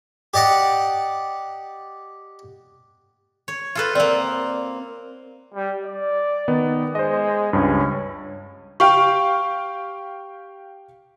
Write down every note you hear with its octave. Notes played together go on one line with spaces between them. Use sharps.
G4 D5 D#5 F#5
C#5
F4 A4 B4
A#3 C4 D5
G3
D5
D#3 B3 D#4
G#3 C5 D#5
C#2 G2 C#4
G4 F5 G5 C#6